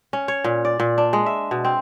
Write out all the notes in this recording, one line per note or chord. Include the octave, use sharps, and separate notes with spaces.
C#4
C#5
A#2
D5
A#2
D4
G#3
E5
B2
C4